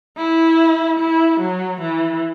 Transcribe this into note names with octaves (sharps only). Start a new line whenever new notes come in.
E4
E4
F#3
E3